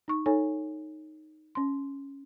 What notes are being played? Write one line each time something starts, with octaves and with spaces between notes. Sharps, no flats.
D#4 C#6
D#4 A4 C#5 G#5
C#4 C6